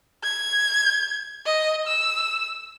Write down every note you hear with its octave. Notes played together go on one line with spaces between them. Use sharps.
G#6
D#5
E6